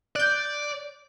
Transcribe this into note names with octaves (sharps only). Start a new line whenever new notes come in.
D5 F#6 G6